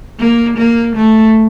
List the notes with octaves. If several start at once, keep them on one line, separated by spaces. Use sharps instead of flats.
A#3
A#3
A3